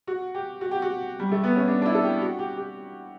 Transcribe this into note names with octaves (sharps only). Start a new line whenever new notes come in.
F#4
G4
F#4
G4
F#4
G3
A3
B3
C#4
D4
D4
E4
A4
G4
F#4
G4
G4